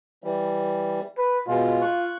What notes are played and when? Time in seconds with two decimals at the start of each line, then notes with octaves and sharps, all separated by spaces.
0.24 E3 G3
1.18 B4
1.48 B2 G#3 F4
1.82 C#6 F#6